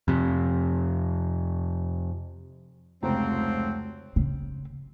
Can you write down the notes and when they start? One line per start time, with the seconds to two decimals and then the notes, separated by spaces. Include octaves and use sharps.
0.08 F2 C3
3.03 F1 C#2 F3 F#3 C4 A#5
4.16 C#3